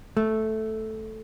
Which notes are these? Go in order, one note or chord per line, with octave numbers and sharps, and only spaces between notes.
A3